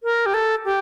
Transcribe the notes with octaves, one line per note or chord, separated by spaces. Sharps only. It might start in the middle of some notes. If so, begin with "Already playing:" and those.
A#4
G4
A4
G4